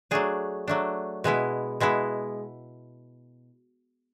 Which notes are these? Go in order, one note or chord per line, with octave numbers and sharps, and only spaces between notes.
F#3 A3 D4 G#4
F#3 A3 D4
B2 G#3 B3 E4
B2 G#3 B3 E4